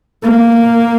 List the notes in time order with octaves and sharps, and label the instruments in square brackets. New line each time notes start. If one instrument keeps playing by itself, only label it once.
[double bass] A#3